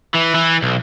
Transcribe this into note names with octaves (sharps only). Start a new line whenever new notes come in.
E3
E3
B1